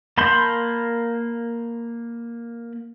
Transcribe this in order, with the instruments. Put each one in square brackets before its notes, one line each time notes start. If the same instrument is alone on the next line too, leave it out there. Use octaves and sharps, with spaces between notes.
[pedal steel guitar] A#3 A5 B5 C6 G6